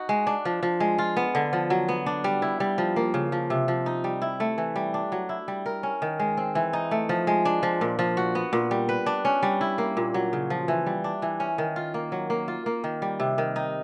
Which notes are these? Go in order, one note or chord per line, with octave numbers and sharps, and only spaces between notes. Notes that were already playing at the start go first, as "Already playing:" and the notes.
Already playing: D#4 F#4
G#3
D4
F3
F3
G#3
F4
B3
D3
F3
F#3
B3
D4
G3
E4
G3
F3
A#3
C#3
F3
C3
F3
D#4
G3
E4
A3
E3
G3
D4
F#3
E4
G3
A#4
C#4
D#3
G#3
C4
E3
D#4
A3
F3
G#3
D4
F3
A#2
F3
F#4
B3
A#2
G3
B4
D4
C#4
G3
E4
A#3
A#2
F#3
C#3
F3
E3
G3
D4
E3
C#4
D#3
F4
A#3
F#3
A#3
F4
A#3
D#3
G3
C3
D#3
D#4